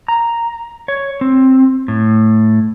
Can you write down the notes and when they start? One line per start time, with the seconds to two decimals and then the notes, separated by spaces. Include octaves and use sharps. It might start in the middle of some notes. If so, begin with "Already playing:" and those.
0.08 A#5
0.88 C#5
1.21 C4
1.88 A2